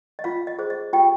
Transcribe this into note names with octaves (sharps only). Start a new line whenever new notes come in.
D#5
F4 F5
D#5
G#4 C5
D#5
F4 G4 G5